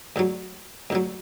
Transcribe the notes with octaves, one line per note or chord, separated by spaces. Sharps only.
D2 D3 F#3
D2 D3 F#3